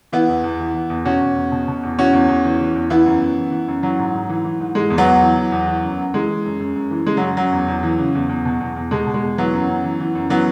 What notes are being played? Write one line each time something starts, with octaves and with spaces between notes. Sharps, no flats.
E3 B3 E4
E2
E2
E3
E3
E2
B2 C#4 F#4
E2
E2
B2
B2
E2
E3 C#4 F#4
E2
E2
E3
E3
E2
E3 B3 E4
F#2
F#2
E3
E3
F#2
E3 F#3
G#2
G#2
E3
E3
G#2
E3 G#3
E2
F#3 B3
E2
E3
E3
E2
E3
F#2
F#2
E3 G#3
E3
F#2
F#2
F#2
E3
C#3 G#3
F#2 F#3
F#2 F#3
E2
E2
E3
C#3
E2
E2
B2
E2
E2
B2 G#3
B2
G#3
E2
E3 F#3 B3
F#2
F#2
E3
E3
F#2
E3 F#3 B3